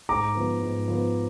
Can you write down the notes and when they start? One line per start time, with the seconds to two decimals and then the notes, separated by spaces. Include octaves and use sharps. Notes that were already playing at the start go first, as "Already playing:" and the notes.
0.09 G#2 A#5 D6
0.35 F3 B3
0.61 G#2
0.88 F3 B3